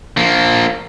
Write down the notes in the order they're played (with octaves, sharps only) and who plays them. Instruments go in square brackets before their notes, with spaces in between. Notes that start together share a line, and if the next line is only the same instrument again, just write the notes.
[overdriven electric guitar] F3 A#3